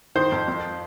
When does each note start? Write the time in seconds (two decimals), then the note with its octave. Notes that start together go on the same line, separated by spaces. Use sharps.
0.15 D#3 C5
0.32 F2
0.48 F2